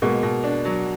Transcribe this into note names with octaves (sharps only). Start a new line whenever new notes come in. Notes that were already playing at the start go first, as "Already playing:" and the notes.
B2 G#3 A#3
B2
D4
F#3